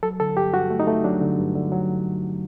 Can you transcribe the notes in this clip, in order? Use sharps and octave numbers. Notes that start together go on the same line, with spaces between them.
F#3 A4
D3 A4
G2 G4
G2 F#4
A3
D#4
A3
F#3 D4
D3
G2
D3
F#3